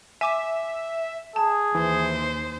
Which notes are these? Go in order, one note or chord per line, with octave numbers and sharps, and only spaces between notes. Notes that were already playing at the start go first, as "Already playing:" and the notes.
E5 G#5 D6 E7
G#4 A5
D#2 E3 C5